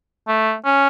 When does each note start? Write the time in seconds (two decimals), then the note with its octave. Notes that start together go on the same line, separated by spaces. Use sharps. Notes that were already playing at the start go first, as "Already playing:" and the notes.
0.28 A3
0.65 C#4